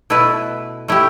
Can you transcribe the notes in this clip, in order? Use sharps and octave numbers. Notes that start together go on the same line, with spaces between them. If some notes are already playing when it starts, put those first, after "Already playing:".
B2 A3 E4 B4
A3 E4 G4